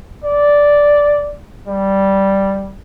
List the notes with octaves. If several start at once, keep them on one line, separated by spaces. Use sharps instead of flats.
D5
G3